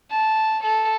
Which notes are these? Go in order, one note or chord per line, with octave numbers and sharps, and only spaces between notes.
A5
A4